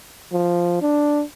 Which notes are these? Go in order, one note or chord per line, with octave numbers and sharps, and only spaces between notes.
F3
D4